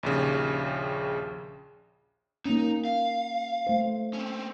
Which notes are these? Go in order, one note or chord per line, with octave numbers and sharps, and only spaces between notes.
A#1 D#2 C#3
A#3 C#4 D#4
F5
A3 C5
C4 C#4